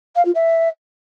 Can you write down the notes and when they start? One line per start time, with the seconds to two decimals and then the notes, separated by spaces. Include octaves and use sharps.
0.15 F5
0.25 F4
0.35 E5